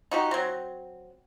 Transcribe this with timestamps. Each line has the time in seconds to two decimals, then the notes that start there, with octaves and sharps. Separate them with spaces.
0.11 D#4 F#4 G4
0.31 F#3 C4